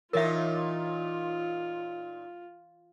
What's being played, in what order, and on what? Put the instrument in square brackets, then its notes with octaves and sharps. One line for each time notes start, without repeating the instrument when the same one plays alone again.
[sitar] A#2 D#4 [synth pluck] E3 C#5 A6 [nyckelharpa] F4 [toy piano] A#4 E5